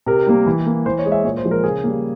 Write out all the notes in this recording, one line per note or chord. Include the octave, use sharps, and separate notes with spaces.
C3 A#4
G3 A#3
E3
A#3
E3 C5
C#5
G#3
E5
A#2 C#5
C5
F3 G#3
A#4
C#3 G#4
G3 A#3